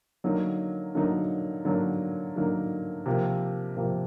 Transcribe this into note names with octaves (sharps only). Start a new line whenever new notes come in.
D3 F#3 A#3 D#4
D3 F#3 A#3 D#4
D3 F#3 A#3 D#4
D3 F#3 A#3 D#4
C3 F3 A#3
C3 F3 A#3